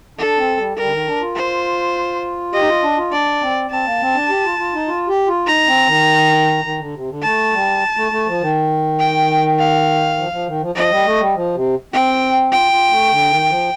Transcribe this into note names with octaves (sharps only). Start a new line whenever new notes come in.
D4 A4
C4
G3
G3 A#4
D3
D#3
D4
F4
C5
G4 D#5
D#4
F4
D4
F4
D4 D5
C4
C4 A5
A#3
C4
D4
G4
F4
F4
D#4
F4
G4
F4
D#4 A#5
C4
D#3
D#3
D3
C3
D3
A3 A5
G3
A3
A3
F3
D#3
G5
F5
F3
F3
D#3
F3
F3 D#5
G3
A3
G3
F3
C3
C4 G5
F4 G5
F4
A3
D3
D#3
F3